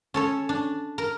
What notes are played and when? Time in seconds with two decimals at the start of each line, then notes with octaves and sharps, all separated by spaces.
0.14 C#4 A4 C#5
0.49 D4
0.98 A#4